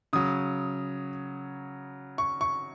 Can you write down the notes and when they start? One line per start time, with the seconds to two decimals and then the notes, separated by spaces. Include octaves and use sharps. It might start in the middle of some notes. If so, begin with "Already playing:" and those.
0.13 C#3 F#3 D#6
2.18 C#6
2.41 C#6